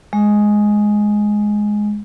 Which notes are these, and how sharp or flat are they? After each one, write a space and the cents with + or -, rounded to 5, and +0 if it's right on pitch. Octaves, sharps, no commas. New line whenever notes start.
G#3 +5